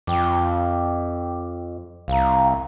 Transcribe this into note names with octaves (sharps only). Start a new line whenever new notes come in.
F2 G5 D6
C2 F5 A#5